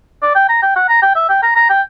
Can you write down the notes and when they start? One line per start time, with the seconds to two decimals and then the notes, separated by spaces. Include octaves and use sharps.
0.22 D5
0.35 G5
0.49 A#5
0.62 G5
0.76 F#5
0.89 A#5
1.02 G5
1.15 E5
1.29 G5
1.42 A#5
1.55 A#5
1.69 G5